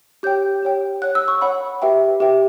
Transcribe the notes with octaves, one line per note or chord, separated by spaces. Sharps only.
G4 C#5 G5 G6
G4 C#5 G5
C#5 F#5 F#6
E6
C#6
C#5 F#5 B5
G4 B4 E5 G5
G4 B4 E5 G5